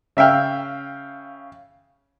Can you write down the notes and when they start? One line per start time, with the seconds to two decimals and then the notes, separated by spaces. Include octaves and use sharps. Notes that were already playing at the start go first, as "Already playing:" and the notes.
0.17 C#3 E5 F5 G5 F6